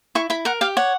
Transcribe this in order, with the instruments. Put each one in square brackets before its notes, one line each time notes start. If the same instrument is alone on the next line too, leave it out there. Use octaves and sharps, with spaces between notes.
[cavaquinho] E4 C#6
E4 B5
A#4 F#5
G4 F5
C#5 F#5